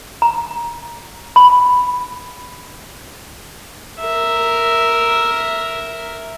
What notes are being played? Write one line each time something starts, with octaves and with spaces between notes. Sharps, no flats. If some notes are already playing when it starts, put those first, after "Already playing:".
A#5
B5
A#4 E5